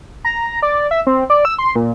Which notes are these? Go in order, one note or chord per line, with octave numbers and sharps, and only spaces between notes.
A#5
D5
E5
C4
D5
E6
C6
A#2